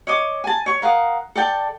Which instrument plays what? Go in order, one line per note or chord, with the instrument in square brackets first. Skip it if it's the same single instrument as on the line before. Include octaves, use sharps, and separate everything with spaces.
[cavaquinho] C#5 D#5 D6
G#5 A5
C#5 C#6
A#4 F5 F#5 D#6
A4 D5 G5 A5